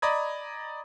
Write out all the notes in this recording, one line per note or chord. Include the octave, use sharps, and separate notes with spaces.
D5 D#5 A#5 B5 D#6 G#6